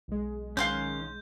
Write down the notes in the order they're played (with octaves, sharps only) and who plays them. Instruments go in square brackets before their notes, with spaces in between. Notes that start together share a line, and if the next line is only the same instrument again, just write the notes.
[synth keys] B1 G#3
[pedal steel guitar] D#3 C#4 [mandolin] F5 C6 F#6 [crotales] G6